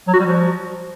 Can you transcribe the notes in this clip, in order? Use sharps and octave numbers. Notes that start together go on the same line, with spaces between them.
F#3
F#4
G3
F3